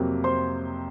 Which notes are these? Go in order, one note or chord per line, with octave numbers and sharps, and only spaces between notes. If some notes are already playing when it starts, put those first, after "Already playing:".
Already playing: F2 C3 F#3 A#3
C5 C6